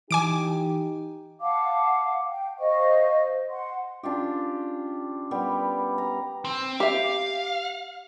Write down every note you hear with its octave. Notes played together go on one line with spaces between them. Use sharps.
E3 D#4 G4 G#5 D6 D7
F5 F#5 A5 D6
G5
C5 D#5 F5 C#6
F#5 C6
C#4 D4 F4 G4
G3 B3 G4
A#5
C4
G4 E5 F5